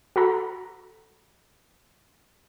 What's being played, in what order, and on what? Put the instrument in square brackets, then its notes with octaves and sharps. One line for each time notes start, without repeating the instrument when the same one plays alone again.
[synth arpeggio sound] F#4 A4 A#5 B5